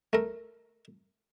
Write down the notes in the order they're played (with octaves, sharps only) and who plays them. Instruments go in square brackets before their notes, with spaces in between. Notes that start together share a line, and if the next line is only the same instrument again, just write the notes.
[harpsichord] A3 A#4